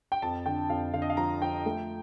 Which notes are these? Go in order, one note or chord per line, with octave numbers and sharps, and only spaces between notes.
G5
F2 A5
D3 G5
F2 F5
D3 F5
D#5
F5
F3 A#5
F3 G5
A3